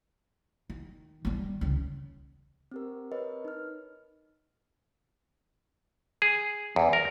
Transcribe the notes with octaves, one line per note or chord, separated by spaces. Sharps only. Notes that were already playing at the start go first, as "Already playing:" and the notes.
D#3
D#3 G3
C#2 C#3
C4 G4 A#4
A#4 B4 C#5 D#5
D#4 F6
G#4
E2
A#4